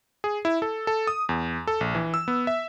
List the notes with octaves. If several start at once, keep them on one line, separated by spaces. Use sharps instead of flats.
G#4
E4
A4
A4
D#6
E2
A4
A#1
E3
E6
B3
E5